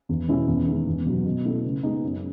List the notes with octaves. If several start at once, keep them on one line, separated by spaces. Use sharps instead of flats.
E2
B2 G#3 C#4 E4
E2
D#3 G#3
E2
B2 F#3 B3
B2
A3 E4 A4
C#3
G#3 B3 D#4
F#2